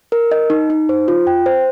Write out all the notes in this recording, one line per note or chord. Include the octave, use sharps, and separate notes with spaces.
A#4
D#5
D#4
D#4
C5
F4
G5
C5